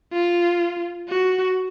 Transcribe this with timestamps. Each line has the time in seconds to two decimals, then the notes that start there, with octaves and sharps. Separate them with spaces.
0.13 F4
1.09 F#4